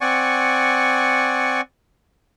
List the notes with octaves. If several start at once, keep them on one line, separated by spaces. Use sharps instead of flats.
C4 D5 F#5 G#5 C#6